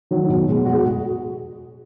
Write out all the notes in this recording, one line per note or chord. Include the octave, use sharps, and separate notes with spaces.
D#3 F#3
B2
G#3 B3
B2 F#4
G#4
F#4